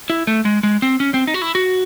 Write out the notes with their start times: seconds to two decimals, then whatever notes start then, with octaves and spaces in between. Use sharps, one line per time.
0.10 E4
0.27 A3
0.45 G#3
0.63 G#3
0.82 C4
1.00 C#4
1.14 C4
1.27 D#4
1.34 F#4
1.42 E4
1.55 F#4